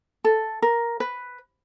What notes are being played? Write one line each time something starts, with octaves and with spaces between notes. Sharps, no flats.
A4
A#4
B4